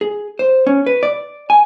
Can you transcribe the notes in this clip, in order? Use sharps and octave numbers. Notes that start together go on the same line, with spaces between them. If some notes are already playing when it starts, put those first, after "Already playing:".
G#4
C5
C#4
B4
D5
G#5